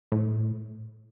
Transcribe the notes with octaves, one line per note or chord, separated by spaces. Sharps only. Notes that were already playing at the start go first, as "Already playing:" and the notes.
A2